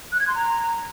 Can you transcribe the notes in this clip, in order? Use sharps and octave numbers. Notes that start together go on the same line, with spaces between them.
F#6
G#6
C6
A#5